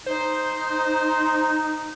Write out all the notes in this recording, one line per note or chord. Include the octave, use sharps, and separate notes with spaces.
D#4 C5